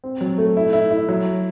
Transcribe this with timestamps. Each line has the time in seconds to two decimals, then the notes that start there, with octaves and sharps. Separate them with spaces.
0.04 C4
0.21 F#3
0.38 A3
0.57 E4
0.73 E4
0.91 E4
1.09 F#3